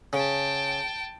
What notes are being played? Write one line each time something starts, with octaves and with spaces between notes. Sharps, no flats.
C#3 G5 A5